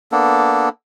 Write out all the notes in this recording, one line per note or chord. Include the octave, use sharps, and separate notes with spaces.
A#3 B3 D4 A4